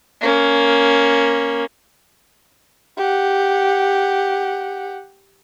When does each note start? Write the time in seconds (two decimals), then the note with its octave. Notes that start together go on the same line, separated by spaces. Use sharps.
0.21 A#3 C#4
2.97 G4 F#5